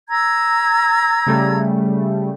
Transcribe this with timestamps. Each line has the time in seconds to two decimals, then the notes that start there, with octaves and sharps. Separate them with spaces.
0.09 A#5 E6 G#6
1.27 C#3 G3 A3